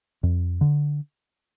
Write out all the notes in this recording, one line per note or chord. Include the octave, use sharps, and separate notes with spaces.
F2
D3